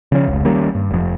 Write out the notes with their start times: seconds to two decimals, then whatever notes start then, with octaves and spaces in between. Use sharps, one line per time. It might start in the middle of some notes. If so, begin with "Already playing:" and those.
0.12 C#3 F3 C#4
0.27 F1 C#2 C#3
0.45 D#3 G3 A#3 C#4
0.75 G2
0.90 F1 F2